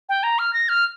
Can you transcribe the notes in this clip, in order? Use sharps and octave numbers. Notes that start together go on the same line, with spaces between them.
G5
A#5
F6
A#6
F6